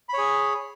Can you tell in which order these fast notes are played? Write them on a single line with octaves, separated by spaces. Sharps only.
B5 C#5 G#4